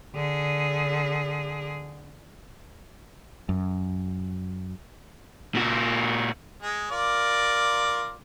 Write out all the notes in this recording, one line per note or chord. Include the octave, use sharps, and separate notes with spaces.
D3 G#4
F#2
A#2 F#4
G#3
F4 A#4 D5